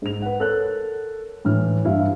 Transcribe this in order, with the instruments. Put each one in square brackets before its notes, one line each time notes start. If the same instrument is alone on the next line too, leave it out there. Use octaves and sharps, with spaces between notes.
[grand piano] G#2 F7
B4 F#5
A4 A#4 C#5 F#6
A2 E3 F6
G2 E4 F5